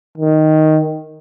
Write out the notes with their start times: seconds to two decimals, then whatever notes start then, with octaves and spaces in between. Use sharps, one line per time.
0.18 D#3